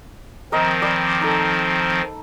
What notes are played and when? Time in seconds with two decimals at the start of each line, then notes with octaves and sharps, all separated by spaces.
0.52 D#3 F3 C4 A#4 D#5
0.82 D5 B5
1.21 D#4 A4